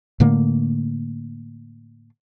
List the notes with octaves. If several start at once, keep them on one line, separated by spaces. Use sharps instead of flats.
A2 D3 A3 A#3